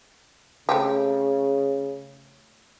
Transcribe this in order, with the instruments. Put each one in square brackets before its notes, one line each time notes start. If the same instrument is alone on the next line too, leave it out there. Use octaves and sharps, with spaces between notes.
[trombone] C#3 [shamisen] A3 C4 G4